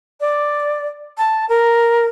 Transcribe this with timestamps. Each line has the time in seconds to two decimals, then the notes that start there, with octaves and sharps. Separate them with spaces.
0.20 D5
1.17 A5
1.48 A#4